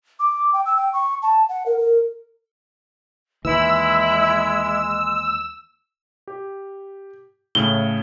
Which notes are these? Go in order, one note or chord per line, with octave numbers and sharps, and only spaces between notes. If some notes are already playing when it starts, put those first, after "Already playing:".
D6
G5
E6
G5
C#6
A5
F#5
A#4
A#4
D#2 E3 G#3 E4 E6
G4
A2 C#3 A3 G7